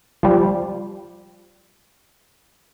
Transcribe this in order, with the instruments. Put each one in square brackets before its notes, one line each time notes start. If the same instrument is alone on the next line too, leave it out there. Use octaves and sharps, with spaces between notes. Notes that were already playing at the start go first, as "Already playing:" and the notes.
[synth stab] F3 G3